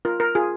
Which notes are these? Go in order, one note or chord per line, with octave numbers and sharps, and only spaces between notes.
F4 A#4
A#4
F4 G#4